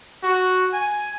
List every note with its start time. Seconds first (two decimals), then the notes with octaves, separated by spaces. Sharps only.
0.23 F#4
0.73 G#5